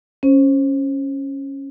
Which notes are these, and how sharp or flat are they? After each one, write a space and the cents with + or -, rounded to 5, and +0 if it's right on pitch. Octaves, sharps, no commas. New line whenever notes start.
C#4 -10 C5 +15